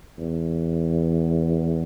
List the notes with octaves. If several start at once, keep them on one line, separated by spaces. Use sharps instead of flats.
E2